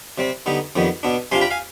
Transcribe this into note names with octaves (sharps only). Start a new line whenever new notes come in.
C3 G3 C4
D3 G3 B3 D#4
F2 D#3 G3 B3
B2 B3 D4
C3 G3 D4 F4 G#5 C6
G5 B5
F5 G#5